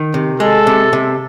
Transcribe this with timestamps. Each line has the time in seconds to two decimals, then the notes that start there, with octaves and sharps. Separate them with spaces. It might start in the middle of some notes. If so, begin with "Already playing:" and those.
Already playing: D#3
0.14 C3
0.40 G#3 A4
0.67 C3
0.93 C3